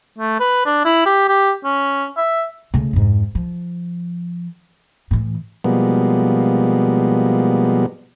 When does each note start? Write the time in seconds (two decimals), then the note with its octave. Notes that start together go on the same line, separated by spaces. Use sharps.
0.18 A3
0.40 B4
0.66 D4
0.85 E4
1.06 G4
1.28 G4
1.65 C#4
2.17 E5
2.74 C#3 A3
2.93 F2 G#2
3.35 F3
5.11 A2 E3
5.64 B2 F3 G3 G#3 A#3 B3